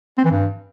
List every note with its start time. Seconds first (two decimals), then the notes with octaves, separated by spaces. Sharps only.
0.18 C4
0.24 E3
0.31 G2